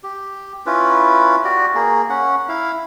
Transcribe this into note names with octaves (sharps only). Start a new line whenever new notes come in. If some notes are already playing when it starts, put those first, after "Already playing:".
G4
C#4 E4 F4 B4
F#4 G4 D5
A#3 G#4
C#4 F#5
E4 F5